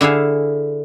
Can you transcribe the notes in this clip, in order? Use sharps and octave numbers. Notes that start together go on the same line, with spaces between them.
D3 E4 G#4 F5